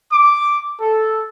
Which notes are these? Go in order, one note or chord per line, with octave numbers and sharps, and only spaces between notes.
D6
A4